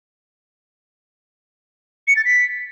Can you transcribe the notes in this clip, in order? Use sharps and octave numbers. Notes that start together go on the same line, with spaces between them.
C#7
A6
B6